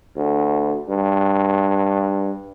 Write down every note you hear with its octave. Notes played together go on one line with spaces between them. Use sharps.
D2
G2